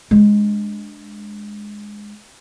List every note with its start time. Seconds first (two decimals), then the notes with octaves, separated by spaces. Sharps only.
0.11 G#3 D4